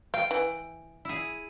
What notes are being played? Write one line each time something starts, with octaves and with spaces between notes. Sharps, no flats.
F5 G5
E3
E4 G#4